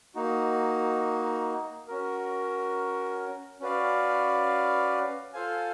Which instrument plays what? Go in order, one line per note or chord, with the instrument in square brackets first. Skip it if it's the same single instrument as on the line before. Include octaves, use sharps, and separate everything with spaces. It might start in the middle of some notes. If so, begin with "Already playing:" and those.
[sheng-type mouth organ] A#3 D#4 F#4
C#4 F#4 A#4
C#4 F#4 B4 D5 F5
F4 A4 C5 F5 G#5